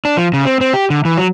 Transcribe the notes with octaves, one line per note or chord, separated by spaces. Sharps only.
D4
F3
C#3
C4
C4
G4
D3
E3
F#3